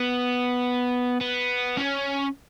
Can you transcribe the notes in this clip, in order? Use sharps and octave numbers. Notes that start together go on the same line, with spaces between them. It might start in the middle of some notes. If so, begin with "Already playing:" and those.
Already playing: B3
B3
C#4